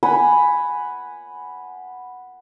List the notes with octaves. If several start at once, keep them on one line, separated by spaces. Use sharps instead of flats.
F#5 G#5 B5